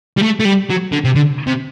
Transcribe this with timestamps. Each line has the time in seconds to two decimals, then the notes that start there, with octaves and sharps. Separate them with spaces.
0.18 G3
0.23 A3
0.40 A3
0.45 G3
0.70 F#3
0.92 D3
1.04 C3
1.15 D3
1.47 C3